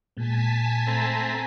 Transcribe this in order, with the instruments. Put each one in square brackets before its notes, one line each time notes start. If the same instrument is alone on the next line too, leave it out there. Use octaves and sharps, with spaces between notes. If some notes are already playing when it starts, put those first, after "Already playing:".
[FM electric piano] A#2 G#3 [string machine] G#5 A5 B6
[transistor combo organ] A3 C4 A#5